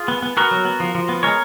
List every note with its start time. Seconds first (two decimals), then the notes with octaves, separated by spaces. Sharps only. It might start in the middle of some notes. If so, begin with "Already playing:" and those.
Already playing: F4 G#4
0.08 B3
0.23 B3
0.37 B3 F#4 A#4
0.51 F#3
0.65 B3
0.80 F3
0.95 F3
1.09 B3
1.23 G#3 A#4 C#5